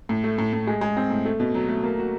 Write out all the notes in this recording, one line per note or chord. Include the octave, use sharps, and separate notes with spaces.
A2
A3
A2
A2
G#3
G#3
C4
A2
A3
B2
F#3
A3
A#3
F#4